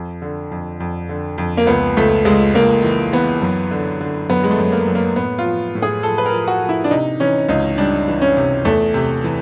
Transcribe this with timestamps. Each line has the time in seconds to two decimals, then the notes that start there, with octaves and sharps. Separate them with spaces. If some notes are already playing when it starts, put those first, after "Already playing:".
Already playing: F2
0.22 D3
0.51 F2
0.80 F2
1.09 D3
1.38 F2
1.57 A#3
1.67 C#2 B3
1.97 C#2 A3
2.25 C#2 G#3
2.54 C#2 A#3
2.84 E3
3.13 E3 B3
3.42 F#2
3.71 D3
4.01 D3
4.29 F#2 B3
4.44 G#3
4.51 A3
4.58 F#2
4.72 A#3
4.88 F#2
4.95 A#3
5.16 A2 B3
5.39 F4
5.45 F3
5.75 A2
5.82 G#4
6.03 F3 A4
6.18 B4
6.26 A#4
6.33 F3
6.48 F#4
6.62 F3
6.69 E4
6.84 D4
6.91 C3 D#4
7.20 E3 C#4
7.49 C#2 D#4
7.78 G3 D4
8.08 E3
8.21 C#4
8.37 C3
8.65 E2 A3
8.94 C3
9.24 E3